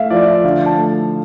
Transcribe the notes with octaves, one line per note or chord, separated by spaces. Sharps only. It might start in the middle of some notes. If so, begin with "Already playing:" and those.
Already playing: A3 E5 F5
F3 D5
E5
D3 F5
A5
A3